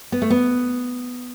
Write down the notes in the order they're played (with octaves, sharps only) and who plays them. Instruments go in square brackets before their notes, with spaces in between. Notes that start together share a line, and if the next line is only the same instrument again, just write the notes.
[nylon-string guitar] B3
A3
B3